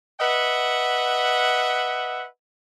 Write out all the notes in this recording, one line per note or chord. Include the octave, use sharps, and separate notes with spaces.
B4 D#5 E5 F#5